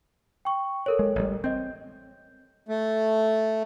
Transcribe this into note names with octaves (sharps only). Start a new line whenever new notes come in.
G5 C#6
A4 A#4 C#5
G#3
A1 G3
C4 D#5 G6
A3